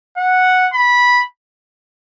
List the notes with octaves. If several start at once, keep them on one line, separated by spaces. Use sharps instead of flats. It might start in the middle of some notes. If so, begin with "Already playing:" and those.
F#5
B5